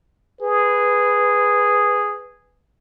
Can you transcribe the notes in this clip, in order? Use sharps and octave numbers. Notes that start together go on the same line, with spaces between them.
G#4 B4